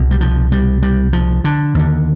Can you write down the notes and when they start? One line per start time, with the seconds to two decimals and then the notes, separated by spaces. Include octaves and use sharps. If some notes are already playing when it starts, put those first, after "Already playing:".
Already playing: C2 B2
0.11 G3
0.21 F3
0.52 G3
0.82 G3
1.13 F3
1.44 D3
1.75 D#2 D3